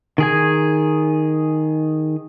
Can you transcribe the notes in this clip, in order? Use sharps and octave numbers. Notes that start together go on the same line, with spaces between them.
D#3 G#4 G#5